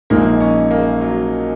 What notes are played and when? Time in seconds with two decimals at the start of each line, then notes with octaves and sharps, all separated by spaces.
0.10 A#1 A#2 G#3 A#3 D#4
0.40 C#4
0.71 A#3
1.01 F#3